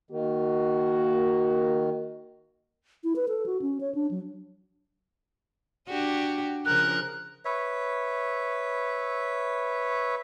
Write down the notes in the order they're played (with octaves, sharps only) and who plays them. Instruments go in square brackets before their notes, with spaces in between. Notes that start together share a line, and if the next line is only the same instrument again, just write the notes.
[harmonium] D#3 [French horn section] A#3 F#4
[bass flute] E4
B4
A4
F#4
C#4
C#5
D4
F#3
[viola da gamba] D4 F#4 G4
[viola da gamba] C#3 F3 A#4 [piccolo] F#6
[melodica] B4 C#5 E5